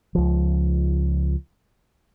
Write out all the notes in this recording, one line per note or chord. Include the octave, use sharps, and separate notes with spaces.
C#2 F3